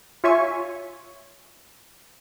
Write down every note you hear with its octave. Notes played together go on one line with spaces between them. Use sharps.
F4 C#5 E5 G#5 C#6